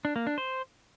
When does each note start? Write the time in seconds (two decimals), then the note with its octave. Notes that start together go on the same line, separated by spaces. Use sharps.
0.05 D4
0.16 A#3
0.27 D4
0.38 C5